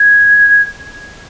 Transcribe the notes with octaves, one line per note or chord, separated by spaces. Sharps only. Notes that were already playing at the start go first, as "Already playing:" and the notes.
Already playing: G#6